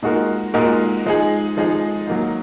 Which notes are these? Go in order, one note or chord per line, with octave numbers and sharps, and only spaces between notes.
A#2 G#3 D#4 F#4 A#4
A#2 G#3 D#4 F#4 A#4
F3 G#3 D#4 G#4
F3 G#3 D#4 G#4
F#3 A#3 D#4